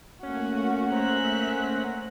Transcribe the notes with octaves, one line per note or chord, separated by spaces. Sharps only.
A3 A#3 C#4 F#4
C5 E5 F#5 A#5 F#6